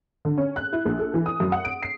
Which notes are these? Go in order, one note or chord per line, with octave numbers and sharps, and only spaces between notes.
D3
C#4
F#6
E4
A#1
A4
E3
D#6
F#2
F#5
D7
C7